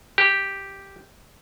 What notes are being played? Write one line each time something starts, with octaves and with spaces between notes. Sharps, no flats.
G4